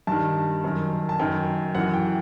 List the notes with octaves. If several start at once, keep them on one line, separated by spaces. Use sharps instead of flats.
G2 D#3 A5
F#2 D#3
A5
F#2 D#3 G5
F#2 E3 F#5
G5